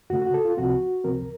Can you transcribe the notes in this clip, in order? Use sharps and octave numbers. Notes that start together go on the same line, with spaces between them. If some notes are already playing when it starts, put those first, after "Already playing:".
F2 C#3 A3 F#4
F#4
A4
F4
C#2 C3 F3 C4 F#4
C#2 C3 F3 C4 A#4